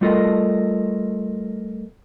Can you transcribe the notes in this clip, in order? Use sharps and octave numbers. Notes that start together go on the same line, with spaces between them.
G3 A3 F4 A4 A#4 D#5